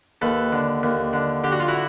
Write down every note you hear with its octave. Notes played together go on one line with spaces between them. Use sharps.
D#2 A4 B4
D3
D#2
D3
D3 G4
F#4
F4
E4 F#4